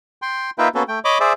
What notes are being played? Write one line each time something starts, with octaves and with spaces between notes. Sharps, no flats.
G5 C6
A#3 D#4 F4 B4 E5 G5
A#3 B3 C#4 F#4 A4
A3 G5
C#5 D#5 B5 D6
G#4 C5 D5 E5